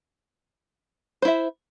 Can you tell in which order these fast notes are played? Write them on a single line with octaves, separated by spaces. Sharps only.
C5 E4 E5